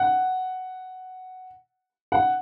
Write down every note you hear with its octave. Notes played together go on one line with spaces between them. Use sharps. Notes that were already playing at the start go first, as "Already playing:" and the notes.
Already playing: F#5
F#5